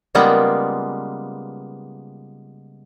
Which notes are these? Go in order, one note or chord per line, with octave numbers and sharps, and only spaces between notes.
C#3 G3 G#3 A#3 B3 F4